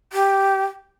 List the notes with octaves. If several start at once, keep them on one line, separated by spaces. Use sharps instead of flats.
G4